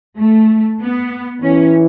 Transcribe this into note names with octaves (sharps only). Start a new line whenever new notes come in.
A3
B3
E3 C#4